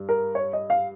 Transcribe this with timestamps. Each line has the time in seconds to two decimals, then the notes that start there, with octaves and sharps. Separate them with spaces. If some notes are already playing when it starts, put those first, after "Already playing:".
Already playing: G2
0.09 A#4
0.35 C#5
0.53 D#5
0.70 F5